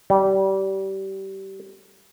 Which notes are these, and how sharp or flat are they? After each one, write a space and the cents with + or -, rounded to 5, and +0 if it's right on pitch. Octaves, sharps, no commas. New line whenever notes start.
G3 -25